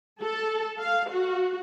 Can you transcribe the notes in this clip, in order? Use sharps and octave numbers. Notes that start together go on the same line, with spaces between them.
A4
F5
F#4